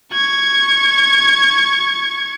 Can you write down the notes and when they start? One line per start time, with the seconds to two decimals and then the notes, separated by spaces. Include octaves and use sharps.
0.13 C#6 G#6